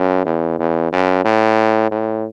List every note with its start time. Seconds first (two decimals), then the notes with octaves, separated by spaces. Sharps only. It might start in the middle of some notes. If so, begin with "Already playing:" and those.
Already playing: F#2
0.25 E2
0.59 E2
0.92 F#2
1.24 A2
1.91 A2